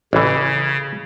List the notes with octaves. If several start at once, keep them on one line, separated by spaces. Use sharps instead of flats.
A1 C#3 E3